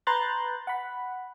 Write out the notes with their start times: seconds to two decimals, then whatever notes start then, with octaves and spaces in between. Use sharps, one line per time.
0.07 B4 A#5 C6 F#6 G6 A6
0.67 F#5 B5